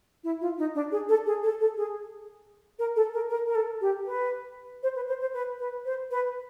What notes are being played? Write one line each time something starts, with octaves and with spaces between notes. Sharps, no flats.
E4
F4
D#4
D4
G#4
A4
G#4
A4
A4
G#4
A#4
A4
A#4
A#4
A#4
A4
G4
B4
C5
B4
C5
C5
B4
B4
C5
B4